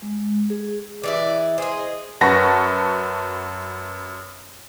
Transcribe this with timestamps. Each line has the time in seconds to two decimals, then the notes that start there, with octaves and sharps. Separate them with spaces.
0.02 G#3
0.50 G#4
1.03 E3 G#3 E4 D5
1.58 G#4 C5 D#5
2.21 F#2 B4 F#5 A5 C#6 A#6